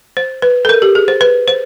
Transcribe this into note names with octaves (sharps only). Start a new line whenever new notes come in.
C5
B4
A4
A#4
G4
G#4
C5
B4
C5